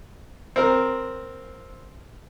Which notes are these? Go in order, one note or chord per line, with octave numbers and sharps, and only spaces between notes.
C4 A#4